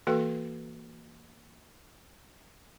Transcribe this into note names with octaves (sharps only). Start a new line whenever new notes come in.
E3 A#3 F#4 A4 B4 G5